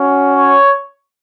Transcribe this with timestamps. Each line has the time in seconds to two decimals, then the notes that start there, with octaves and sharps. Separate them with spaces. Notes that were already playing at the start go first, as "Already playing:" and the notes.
Already playing: C#4 F#4
0.36 C#5